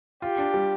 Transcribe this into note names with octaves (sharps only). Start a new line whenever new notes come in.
F4 G4
D4
G3